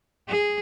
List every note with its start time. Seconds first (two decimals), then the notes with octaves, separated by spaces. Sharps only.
0.29 G#4